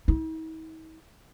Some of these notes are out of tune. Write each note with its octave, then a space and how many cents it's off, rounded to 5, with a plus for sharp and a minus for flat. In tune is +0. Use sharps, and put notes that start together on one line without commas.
D#4 +45